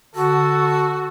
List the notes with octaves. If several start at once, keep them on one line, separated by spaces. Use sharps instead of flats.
D3 F#4 A4